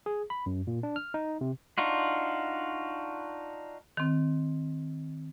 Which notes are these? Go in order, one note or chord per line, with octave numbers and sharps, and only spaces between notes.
G#4
B5
F#2
A#2
D4
F6
D#4
C3
D4 D#4 F4 F#4
D#3 C4